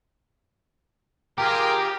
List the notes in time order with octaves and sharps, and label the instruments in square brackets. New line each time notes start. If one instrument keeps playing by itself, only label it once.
[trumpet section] F4 G#4 A#4 [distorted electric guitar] G4 [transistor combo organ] G5 A#5 D6